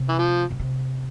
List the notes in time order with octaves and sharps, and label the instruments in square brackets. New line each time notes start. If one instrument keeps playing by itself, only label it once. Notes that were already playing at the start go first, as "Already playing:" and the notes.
Already playing: [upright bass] C3
[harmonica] E3
F3
[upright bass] B2
C3